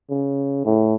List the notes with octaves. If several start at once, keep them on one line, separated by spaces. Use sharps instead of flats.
C#3
A2